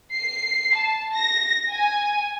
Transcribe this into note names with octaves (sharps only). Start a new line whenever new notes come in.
C7
A5
A#6
G#5